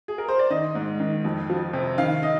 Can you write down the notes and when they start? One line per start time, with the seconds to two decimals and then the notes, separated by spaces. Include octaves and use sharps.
0.08 G#4
0.18 A#4
0.28 C5
0.39 D5
0.50 D#3 D#5
0.75 G#2
1.00 D#3
1.25 F2
1.50 F3
1.73 C3
1.98 D#3 F5
2.23 D#5